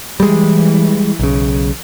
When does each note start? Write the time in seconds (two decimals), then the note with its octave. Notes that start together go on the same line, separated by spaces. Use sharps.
0.20 E3 G3 G#3
1.19 B1 C#3